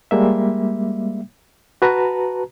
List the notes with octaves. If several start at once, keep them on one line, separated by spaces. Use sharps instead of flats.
G3 G#3 A#3 E5
F#4 B4 A5 A#5